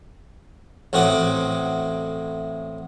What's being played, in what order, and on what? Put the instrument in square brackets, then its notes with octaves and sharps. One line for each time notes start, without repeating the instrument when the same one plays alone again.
[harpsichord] A1 A2 C4 F#4 D6 D#6